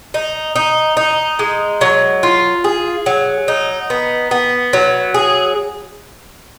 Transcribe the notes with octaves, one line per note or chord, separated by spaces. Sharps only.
D#4
D#4
D#4
G#3
F#3
F4
G#4
F#3
D#4
B3
B3
F#3
G#4